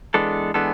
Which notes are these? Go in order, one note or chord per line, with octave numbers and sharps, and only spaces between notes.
E3 G#3 B3 D4 A4
E3 G#3 B3 D4 A4